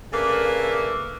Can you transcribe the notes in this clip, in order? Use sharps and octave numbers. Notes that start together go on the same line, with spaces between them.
C#3 A3 A#3 D4 B4